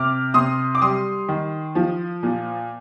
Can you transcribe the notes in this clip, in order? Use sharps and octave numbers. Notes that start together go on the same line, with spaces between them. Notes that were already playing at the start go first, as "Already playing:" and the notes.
Already playing: C3 D6 F6
C3 C6 D#6
D6
G3 C6 D#6
D#3
F3
A#2